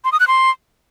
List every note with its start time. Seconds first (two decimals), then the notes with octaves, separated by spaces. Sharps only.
0.04 C6
0.12 D#6
0.20 F#6
0.28 C6